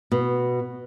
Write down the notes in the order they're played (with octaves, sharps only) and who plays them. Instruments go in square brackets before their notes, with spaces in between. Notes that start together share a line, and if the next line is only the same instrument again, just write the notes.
[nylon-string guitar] B2